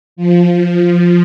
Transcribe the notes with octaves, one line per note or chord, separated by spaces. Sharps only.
F3